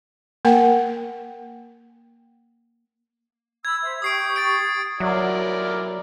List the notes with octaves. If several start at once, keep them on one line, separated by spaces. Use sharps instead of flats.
A#3 A#4 F#5 G5
B5 E6 G#6
C5 E5
G4 C#6 D#6 C7 D7
A6 D7
F#3 E4 A#4 D5